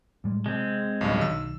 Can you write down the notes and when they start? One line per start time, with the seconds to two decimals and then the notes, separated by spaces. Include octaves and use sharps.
0.24 A2 G3 G#3
0.46 C3 G#3 C4
1.01 D1 B1 G2
1.21 B1 D#3 E6